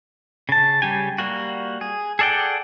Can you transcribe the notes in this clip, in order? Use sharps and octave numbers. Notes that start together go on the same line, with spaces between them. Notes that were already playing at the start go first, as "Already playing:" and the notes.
C#3 A5
C#3 G3 G4 G#5
G3 A#3 F#4
G#4
G#4 A4 D5 F#5 G5